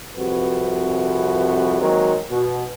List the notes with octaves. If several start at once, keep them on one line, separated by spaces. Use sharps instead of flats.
C2 F2 F#4 B4
D#3 F#3 G#3 A#3 C4
B2